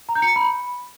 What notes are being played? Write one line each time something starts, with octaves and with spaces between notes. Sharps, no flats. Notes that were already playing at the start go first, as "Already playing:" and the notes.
A#5
G6
C#7
A#5
B5